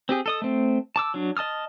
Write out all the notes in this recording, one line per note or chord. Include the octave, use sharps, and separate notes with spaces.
C4 G4 G#4
A4 D#5 D#6
A3 C4
A5 D6 E6
F#3 D4
D#5 A5 D#6 F6